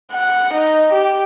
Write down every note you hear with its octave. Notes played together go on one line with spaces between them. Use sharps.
F#5
D#4
G4